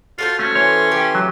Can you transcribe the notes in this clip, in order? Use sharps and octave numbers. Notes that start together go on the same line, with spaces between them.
F4 F#4 A4 C5
A3 C#4
E3 A3 C#5 C6
G4
F#3